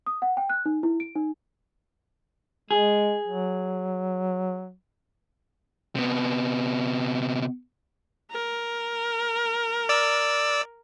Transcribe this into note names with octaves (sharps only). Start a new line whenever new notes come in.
D#6
F#5
G5
F#6
D#4
E4
D7
D#4
G#3 G#4
F#3
C3 B3
A#4
D5 E6